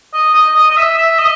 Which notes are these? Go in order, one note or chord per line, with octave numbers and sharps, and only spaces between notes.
D#5
D#5
D#5
D#5
E5
E5
D#5